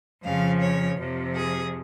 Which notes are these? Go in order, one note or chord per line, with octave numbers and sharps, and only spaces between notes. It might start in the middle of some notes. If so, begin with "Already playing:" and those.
F2 C#3 F3 F5
C#5
F2 C3 F3
G#4